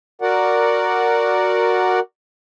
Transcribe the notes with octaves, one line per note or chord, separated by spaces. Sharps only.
F#4 A#4 D5 F#5